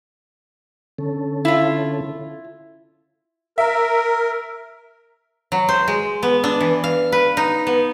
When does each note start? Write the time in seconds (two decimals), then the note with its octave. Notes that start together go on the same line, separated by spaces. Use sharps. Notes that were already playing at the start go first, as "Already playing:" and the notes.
0.98 D3 C#4 A4
1.45 E4 F4
3.58 A#4 E5
5.52 F#3
5.69 C5
5.88 G#3
6.23 B3
6.44 D4
6.61 E3
6.84 F5
7.12 B4
7.37 D#4
7.67 B3